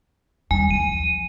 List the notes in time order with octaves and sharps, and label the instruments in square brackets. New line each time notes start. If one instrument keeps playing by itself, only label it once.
[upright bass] D#2 G3 [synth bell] G#5
[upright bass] F3 [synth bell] D#7